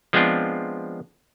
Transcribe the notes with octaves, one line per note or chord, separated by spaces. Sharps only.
F3 G#3 B3 C4 D4 F4